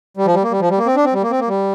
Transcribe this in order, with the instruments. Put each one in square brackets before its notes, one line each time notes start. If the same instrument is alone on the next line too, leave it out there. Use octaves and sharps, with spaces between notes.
[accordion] G3
F3
G3
A#3
G3
F3
G3
A#3
C4
D4
C4
G3
A#3
C4
A#3
G3